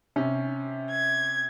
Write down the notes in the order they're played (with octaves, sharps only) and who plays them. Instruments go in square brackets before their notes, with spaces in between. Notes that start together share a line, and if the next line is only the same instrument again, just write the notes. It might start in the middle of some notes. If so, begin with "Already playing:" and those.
[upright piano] C3 C#4
[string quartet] G#6